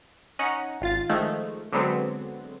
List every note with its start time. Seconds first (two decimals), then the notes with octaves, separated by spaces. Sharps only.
0.39 C#4 D#4 F#5
0.81 G#1 F4 A6
1.09 D#3 F3 G#3 A3
1.72 D3 F#3 G#3 B3 C4